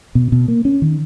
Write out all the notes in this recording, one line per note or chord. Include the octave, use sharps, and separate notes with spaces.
B2
B2
A#3
C#4
D#3